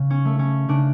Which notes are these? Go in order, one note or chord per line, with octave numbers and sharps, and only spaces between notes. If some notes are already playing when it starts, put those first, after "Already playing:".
Already playing: C#3
C#4
A3
C#4
C#3 D4